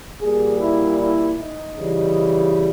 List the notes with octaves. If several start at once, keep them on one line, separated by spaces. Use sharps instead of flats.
A#2 G3 G#4
E4
E4
D#4
C#3 E3 G3